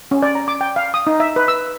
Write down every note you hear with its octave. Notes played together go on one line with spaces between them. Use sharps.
C#4
D5
A#5
D6
G5
F5
D#6
D#4
E5
B4
E6